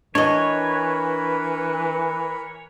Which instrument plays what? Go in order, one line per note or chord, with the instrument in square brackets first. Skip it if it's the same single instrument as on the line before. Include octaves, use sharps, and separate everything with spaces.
[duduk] E3 [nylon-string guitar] D4 D#5 [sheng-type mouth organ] A#4 B4 B5 [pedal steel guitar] C#5